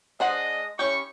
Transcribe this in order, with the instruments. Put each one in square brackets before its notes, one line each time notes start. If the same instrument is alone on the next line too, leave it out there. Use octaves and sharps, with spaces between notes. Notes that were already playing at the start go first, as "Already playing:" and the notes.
[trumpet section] G#3 D#5 [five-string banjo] D4 C5 F#5
[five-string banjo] C#4 G4 [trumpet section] E4 C#6